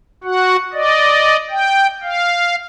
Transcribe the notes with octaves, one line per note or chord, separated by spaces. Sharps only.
F#4 F#5
D5 D#5
G5
F5